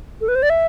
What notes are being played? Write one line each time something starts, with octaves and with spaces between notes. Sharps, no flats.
A4
B4
C5
D5
E5